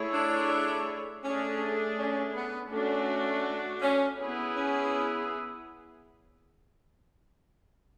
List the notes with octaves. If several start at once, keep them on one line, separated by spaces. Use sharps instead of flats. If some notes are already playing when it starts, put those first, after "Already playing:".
Already playing: A3 E4 G#4 C#5
D4
A3 C#4 D4 G#4
C#4
B3
A3 C#4 D4 F#4
C#4
B3 E4 G#4 B4
C#4